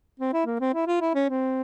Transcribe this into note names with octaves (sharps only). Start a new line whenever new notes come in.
C4
E4
A#3
C4
E4
F4
E4
C#4
C4